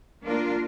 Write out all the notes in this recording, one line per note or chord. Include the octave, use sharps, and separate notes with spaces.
A#3 D4 F4 A#4